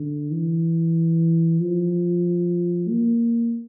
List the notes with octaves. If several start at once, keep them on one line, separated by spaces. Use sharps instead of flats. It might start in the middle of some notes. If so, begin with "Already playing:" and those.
Already playing: D3
E3
F3
A#3